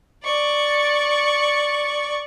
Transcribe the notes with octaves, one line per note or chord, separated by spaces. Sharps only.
D5 C#6